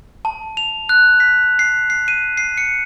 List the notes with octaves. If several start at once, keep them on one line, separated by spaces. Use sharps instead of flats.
A5
F7
F#6
B6
C7
C7
D#7
C7
C#7